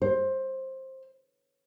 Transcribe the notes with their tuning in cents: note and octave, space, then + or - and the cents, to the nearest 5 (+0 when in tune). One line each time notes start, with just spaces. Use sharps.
C5 +15